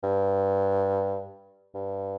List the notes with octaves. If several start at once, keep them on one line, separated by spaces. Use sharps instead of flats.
G2
G2